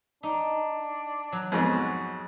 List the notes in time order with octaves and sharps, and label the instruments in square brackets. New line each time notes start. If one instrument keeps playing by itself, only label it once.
[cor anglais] D4 [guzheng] D#4
[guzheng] F#3
[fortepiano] F2 G#2 B2 [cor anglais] F#4